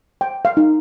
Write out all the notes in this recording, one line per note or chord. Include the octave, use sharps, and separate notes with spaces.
G5
F5
D#4